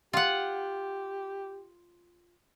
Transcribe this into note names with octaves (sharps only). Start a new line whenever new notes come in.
F4 G4 F#5